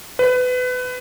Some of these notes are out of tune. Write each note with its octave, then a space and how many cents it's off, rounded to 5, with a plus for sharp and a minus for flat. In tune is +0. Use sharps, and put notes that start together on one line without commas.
B4 +25